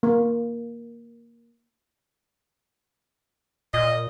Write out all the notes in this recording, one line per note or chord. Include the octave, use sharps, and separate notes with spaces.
A#3
A#2 D#5